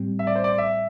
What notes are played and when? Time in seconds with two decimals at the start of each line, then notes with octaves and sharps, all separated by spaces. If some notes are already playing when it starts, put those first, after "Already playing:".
Already playing: A2 G3 C4
0.19 E5
0.27 D5
0.35 C5
0.44 D5
0.58 E5